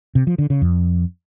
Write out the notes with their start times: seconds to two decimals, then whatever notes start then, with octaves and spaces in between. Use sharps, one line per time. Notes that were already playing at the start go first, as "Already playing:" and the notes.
0.15 C3
0.27 F3
0.38 D3
0.50 C#3
0.62 F2